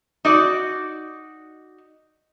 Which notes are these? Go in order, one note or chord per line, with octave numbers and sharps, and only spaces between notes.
D#4 F#4 D5